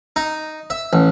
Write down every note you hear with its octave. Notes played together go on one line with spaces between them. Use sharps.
D#4
E5
A1